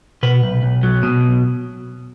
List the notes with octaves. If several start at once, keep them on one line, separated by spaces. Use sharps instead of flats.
B2 B4
B1
B1
F#3
B2